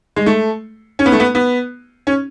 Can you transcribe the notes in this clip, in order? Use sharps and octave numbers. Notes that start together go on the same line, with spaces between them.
G#3
A3
C#4
B3
A3
B3
B3
C#4